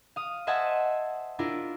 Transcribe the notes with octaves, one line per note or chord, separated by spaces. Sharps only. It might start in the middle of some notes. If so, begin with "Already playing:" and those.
F5 D#6
C5 D#5 E5 F#5 G#5 A5
D4 E4 F4 A#4